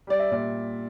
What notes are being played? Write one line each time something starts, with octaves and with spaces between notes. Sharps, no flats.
G3 D5
E5
A#2 D5